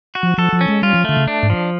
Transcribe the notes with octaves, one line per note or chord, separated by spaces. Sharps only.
F#4
F3
F3 A4
F3
C#4
G#3
G3 F4
F3
D3 A3
C#3
D4
G#2
F3